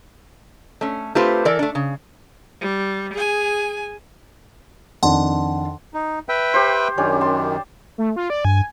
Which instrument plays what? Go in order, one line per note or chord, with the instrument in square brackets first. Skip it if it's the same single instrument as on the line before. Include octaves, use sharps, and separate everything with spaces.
[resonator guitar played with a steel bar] A3 C#4
A3 C4 F4 G4 B4 C5
E3 A4 A#4 D5
A3 D4
C#3
[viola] G3
G#4 G#5
[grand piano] F2 D#3 D4 [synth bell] F#5 A5 C6
[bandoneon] D#4
B4 E5 G5
[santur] G4 C5
[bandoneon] F#2 D#3 [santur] C#4 D4 G4
[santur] A5 C6
[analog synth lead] A3
F4
D5
[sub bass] G2 [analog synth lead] G#5